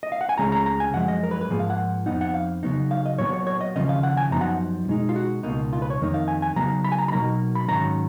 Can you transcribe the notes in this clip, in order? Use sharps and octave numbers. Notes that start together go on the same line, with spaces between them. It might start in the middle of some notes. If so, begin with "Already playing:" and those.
D#5
F5
F#5
G#5
C#2 C#3 G#3 C#4 A#5
A#5
A#5
G#5
F#2 F3 G#3 F#5
D#5
A#4
B4
B4
G#2 F3 A#3 G#4
F5
F#5
F2 F3 B3 D#4 F#5
F#5
F5
C#3 F#3 B3 D#4
F5
D#5
A#2 F#3 B3 C#5
C#5
C#5
D#5
D#2 C#3 F3 C#4 D#5
F5
F#5
G#5
F#2 F3 B3 D#4 A#5
F#5
B2 G#3 D#4
F4
F#4
C#2 B2 A#3 D#4
F4
B4
C#5
F2 D#3 A#3 D#4
F5
G#5
G#5
C#3 F#3 B3 D#4 A#5
B5
G#5
A#5
B5
B2 F#3 A#3 D#4 A#5
B5
G#2 D#3 F#3 C#4 A#5